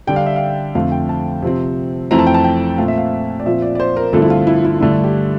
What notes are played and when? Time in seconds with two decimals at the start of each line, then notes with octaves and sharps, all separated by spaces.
0.07 D3 G3 D4 G5
0.16 F5
0.26 E5
0.36 F5
0.75 F2 D3 A3 C4 F5
0.92 G5
1.09 A5
1.42 C3 F3 C4
2.11 F2 E3 A3 C4 A#5
2.19 A5
2.27 G5
2.34 A5
2.44 G5
2.78 A#2 A3 C4 F5
2.88 E5
2.98 F5
3.40 D5
3.45 A#2 F3 C4 E5
3.62 D5
3.75 D5
3.80 C5
3.97 A#4
4.13 G2 D3 F3 A3 C4 A4
4.22 E4
4.30 F4
4.47 E4
4.65 E4
4.80 G2 D3 A3 D4 E4
5.04 G4